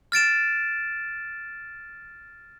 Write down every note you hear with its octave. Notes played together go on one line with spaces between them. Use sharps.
F6 A6 D7 E7